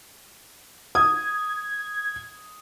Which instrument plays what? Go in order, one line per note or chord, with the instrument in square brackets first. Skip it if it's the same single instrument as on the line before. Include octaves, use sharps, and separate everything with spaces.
[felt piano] D#6 [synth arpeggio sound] G#6